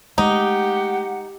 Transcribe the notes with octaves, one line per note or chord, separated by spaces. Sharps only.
G#3 A3 D#4 G4 F#5